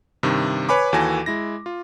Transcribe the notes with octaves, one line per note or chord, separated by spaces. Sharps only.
G2 C3 D#3
B4 C#5 G#5 B5 D6
D#2 E3 F#4 A4 G#5 A#6
G#3 E4 A#6
F4